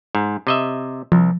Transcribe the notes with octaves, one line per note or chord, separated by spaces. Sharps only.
G#2
C3 D#5 E5
C2 F3